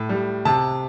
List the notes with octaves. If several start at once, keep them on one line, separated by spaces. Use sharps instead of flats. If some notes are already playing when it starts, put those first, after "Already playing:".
Already playing: A2
G3
C3 A5